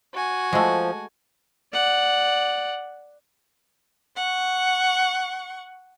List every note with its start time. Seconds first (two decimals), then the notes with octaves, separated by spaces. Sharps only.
0.13 F#4 G#5
0.53 F3 G#3 A3
1.73 D5 F#5
4.17 F#5 C#6